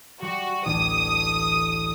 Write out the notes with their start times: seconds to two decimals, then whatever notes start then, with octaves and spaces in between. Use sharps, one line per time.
0.22 G3 F#4
0.66 A1 D2 D4 D#6